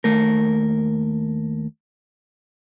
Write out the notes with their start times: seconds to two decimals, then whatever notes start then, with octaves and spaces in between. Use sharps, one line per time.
0.04 D#2 A3 A#4